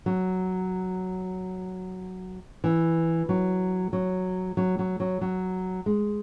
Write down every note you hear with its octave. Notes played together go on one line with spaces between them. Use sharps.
F#3
E3
F#3
F#3
F#3
F#3
F#3
F#3
G#3